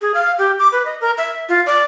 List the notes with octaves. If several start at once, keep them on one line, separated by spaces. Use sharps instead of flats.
G#4
F5
G4
D6
B4
D#5
A#4
E5
F4
D5